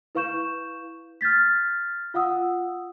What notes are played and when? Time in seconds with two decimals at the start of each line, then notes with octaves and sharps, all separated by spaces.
0.15 E4 B4 F5 C#6 G6 E7
1.21 F6 G6 A6 B6
2.14 F4 F5 F#5 D#6 E6